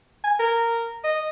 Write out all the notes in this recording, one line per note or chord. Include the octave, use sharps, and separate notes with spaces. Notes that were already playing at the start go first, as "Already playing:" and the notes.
G#5
A#4
D#5